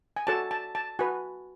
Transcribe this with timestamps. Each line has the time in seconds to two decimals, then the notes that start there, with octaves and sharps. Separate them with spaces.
0.16 G#5
0.27 F#4 A4 C#5 A5
0.51 A5
0.75 A5
0.99 F#4 B4 G#5